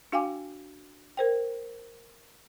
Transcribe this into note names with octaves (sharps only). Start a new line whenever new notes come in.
D4 F#4 F5 G5 G#5 D6
A#4 C5 G5